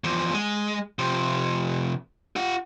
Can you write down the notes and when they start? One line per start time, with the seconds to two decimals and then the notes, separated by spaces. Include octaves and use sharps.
0.04 E2 F3
0.34 G#3
0.99 C3 F3
2.36 F4 F#5